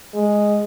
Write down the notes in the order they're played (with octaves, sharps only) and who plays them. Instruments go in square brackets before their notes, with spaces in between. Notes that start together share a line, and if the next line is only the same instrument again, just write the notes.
[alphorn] G#3